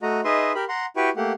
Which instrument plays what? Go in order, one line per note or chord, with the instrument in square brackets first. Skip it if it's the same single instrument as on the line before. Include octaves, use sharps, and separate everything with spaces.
[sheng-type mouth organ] A3 F#4 D#5 A#5
D#4 G#4 B4 D#5 E5 C6
G4 A#4 B5
F#5 A#5 C6
E4 F#4 G4 B4 G5 C#6
A3 A#3 G4 F#5